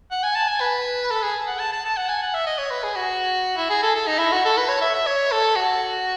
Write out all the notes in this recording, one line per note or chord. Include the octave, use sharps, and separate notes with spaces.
F#5
G#5
A5
G#5
B4
A4
G#4
F#5
A5
A5
A5
F#5
G#5
F#5
E5
D#5
C#5
B4
G#4
F#4
E4
G#4
A4
A4
D#4
E4
F#4
A4
B4
C#5
E5
E5
C#5
A4
F#4